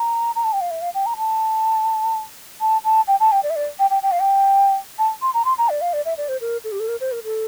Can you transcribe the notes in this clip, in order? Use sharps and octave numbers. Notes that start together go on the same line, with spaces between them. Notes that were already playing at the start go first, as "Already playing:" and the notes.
Already playing: A#5
A#5
A5
G5
F5
E5
F5
G5
A#5
A5
A5
A5
G5
A5
G5
D5
E5
D5
G5
G5
G5
F5
G5
A5
C6
A#5
C6
A#5
D5
F5
D5
E5
D5
C5
A#4
A4
G4
A4
A#4
C5
A#4
A4